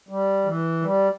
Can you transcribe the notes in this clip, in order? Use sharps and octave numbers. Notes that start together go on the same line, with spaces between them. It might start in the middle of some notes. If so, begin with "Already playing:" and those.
G3
E3
G3